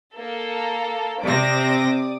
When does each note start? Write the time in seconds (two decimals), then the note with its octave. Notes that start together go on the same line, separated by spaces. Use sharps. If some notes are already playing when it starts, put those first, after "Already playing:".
0.14 A#3 A4
1.22 C3 C4 D5 D6 D#6 A#6